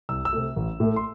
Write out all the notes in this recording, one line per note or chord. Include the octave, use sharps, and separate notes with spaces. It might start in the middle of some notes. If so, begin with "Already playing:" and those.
C2 E6
E6
C3 A3
A1
A2 A3
C6